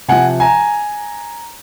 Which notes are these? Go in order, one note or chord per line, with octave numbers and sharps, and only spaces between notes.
C3 F3 F#5 G#5
G#5 A#5